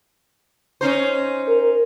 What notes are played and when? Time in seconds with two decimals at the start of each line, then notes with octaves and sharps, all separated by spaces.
0.81 C#4 D#4 C5
1.47 A#4